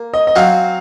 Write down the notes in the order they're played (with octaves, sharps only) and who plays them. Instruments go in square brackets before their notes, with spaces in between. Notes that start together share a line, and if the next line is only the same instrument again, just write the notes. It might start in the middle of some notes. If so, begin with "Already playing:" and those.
Already playing: [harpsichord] A#3
[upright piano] D#5
D#5
[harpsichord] F#3 C4 F#4 [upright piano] F5